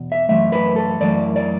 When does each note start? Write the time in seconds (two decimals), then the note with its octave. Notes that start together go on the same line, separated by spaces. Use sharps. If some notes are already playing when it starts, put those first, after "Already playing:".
Already playing: E2 B2
0.12 E5
0.29 F#2 E3 A3 E5
0.52 B4
0.76 A4
1.00 F#2 E3 A3 D5
1.36 D5